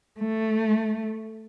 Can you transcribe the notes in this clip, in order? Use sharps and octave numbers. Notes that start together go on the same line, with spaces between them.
A3